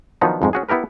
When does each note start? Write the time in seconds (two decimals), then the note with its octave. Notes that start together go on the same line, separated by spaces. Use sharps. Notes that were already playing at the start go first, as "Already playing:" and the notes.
0.21 D#3 F3 F#3 B3 D4 D#4
0.42 F2 G#2 G#3
0.53 C#4 F#4 G#4
0.69 B3 E4 G4 A#4 B4